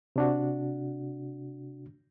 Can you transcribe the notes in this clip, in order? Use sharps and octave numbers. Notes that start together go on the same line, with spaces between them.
C3 D4 F#4